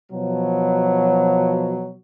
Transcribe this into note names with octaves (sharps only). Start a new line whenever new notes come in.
B2 F3 F#3